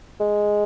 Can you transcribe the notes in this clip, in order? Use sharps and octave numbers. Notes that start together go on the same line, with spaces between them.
G#3